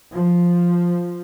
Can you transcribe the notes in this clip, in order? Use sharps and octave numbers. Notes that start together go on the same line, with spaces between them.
F3